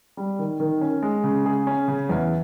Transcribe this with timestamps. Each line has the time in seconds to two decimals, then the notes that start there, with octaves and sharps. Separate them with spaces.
0.17 G3
0.39 D#3
0.60 D#3
0.81 C#4
1.02 G#3
1.24 C#3
1.46 G#4
1.67 C#4
1.88 C#3
2.09 E2